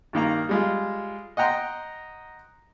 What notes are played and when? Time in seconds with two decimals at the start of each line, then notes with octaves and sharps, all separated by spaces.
0.13 G2 D#3 A#3 A#5
0.49 G3 G#3 F4
1.37 D#5 F#5 G5 A#5 C6